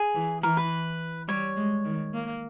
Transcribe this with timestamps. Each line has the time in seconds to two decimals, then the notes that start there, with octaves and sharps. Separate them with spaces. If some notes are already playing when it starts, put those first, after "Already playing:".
Already playing: G#4
0.15 E3
0.42 E3 A#4
0.57 B4
1.28 G3 C#5
1.57 G#3
1.85 D#3
2.14 A#3